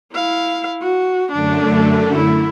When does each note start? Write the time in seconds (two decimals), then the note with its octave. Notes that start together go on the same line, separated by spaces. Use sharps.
0.13 E4 F5
0.82 F#4
1.32 F#2 D3 A3 D4
2.15 E4